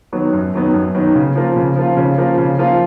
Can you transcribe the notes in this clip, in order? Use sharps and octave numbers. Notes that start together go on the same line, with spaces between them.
D#3 F#3 B3
F#2
D#3 F#3 B3
F#2
D#3 F#3 B3
C#3
F3 A#3 F4
C#3
F3 A#3 F4
C#3
F3 A#3 F4
C#3
F3 A#3 F4